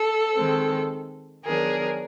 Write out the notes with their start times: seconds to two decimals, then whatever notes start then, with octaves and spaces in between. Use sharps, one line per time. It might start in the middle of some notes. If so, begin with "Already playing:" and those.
Already playing: A4
0.34 D#3 G#3 C4
1.44 D#3 F#3 B3 D4 G#4 A#4